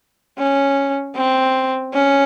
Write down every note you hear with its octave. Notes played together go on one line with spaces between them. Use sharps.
C#4
C4
C#4